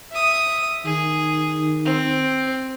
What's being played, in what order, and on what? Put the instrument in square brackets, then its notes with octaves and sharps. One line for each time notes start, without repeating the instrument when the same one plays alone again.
[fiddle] E5 D#6
[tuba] D#3 [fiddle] G#4
[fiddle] C4